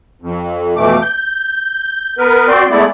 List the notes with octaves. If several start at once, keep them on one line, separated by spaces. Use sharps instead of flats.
F2
F2 B2 E3 A3 D6
G6
B3 A#4 B4
C4 F#4 D5 G5 C6
G#3 A3 B3 E4 D5